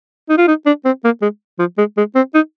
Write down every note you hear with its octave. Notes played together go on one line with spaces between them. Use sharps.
D#4
F4
D#4
D4
C4
A#3
G#3
F3
G#3
G#3
C4
D#4